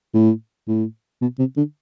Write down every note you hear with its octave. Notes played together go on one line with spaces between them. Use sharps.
A2
A2
B2
C3
D3